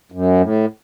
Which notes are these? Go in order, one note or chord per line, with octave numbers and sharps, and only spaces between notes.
F#2
A2